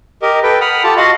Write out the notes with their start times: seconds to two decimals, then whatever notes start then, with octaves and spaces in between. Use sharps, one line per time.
0.22 G4 A#4 D#5
0.43 A4 B4 G5
0.61 F#5 B5 D#6 F6
0.84 F4 G4 A4 A5
0.97 F#4 D#5 F5 F#5 C6